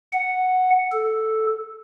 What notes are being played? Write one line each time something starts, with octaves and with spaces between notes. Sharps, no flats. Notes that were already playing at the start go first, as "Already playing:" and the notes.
F#5
A4